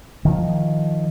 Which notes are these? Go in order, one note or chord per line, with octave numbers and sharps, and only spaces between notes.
D#3 F3